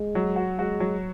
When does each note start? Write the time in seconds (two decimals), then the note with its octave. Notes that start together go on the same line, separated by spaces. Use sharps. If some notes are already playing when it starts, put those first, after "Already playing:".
Already playing: G#3
0.15 F#3
0.36 F#4
0.58 G#3 F#4
0.80 F#3